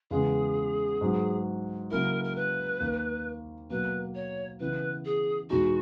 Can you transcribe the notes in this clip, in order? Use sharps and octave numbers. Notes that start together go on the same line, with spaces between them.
E2 C#3 G#3 B3 G#4
G#2 F#3 B3
C#3 F#3 A#3 C#4 E4 A#4
A#4
B4
D#2 D#3 A#3
B2 F#3 A#3 B4
C#5
C#3 E3 B3 E4 B4
G#4
E2 B2 G#3 D#4 F#4